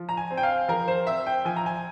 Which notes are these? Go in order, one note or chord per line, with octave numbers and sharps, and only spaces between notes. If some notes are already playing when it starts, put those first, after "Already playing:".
Already playing: F3
A#5
G#5
C4
G5
F5
F3 A#4
C5
C4 E5
G5
F3 G#5
A#5
G#5